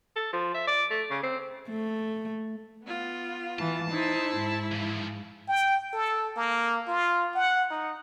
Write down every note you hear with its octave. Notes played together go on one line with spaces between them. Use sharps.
A4
F3
E5
D5
A3
C#3
C4
A3
B3 F4
E3 A5
D#4 E4 C5 E5
G#2
E3 F3
G5
A4
A#3
F4
F#5
D#4